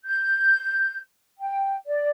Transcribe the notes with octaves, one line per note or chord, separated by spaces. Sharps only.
G6
G5
D5